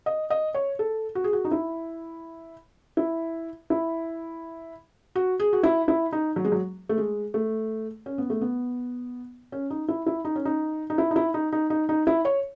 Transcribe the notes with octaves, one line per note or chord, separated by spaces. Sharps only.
D#5
D#5
C#5
A4
F#4
G#4
F#4
D#4
E4
E4
E4
F#4
G#4
F#4
E4
E4
D#4
F#3
G#3
F#3
A3
G#3
A3
C#4
B3
A3
B3
C#4
D#4
E4
E4
D#4
C#4
D#4
D#4
E4
D#4
E4
D#4
D#4
D#4
D#4
E4
C#5